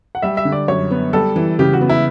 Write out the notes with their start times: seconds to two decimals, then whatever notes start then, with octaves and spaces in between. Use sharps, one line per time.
0.15 F#5
0.22 G3 E5
0.37 E5
0.45 D3
0.52 D5
0.68 F#2 C#5
0.91 B3
1.13 G3 A4
1.36 E3
1.59 C#3 G4
1.73 F#4
1.81 B3
1.89 E4